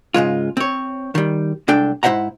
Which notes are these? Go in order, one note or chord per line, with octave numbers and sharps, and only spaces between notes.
G#2 C#3 G#3 F4
C4 C#5
D#3 G3
C2 G#3 D4 A4 G5
G#2 E4 C5 E5 F#5 A#5